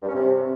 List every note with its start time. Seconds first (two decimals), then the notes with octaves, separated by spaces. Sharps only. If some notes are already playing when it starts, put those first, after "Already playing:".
0.03 G2
0.09 C#4
0.15 C3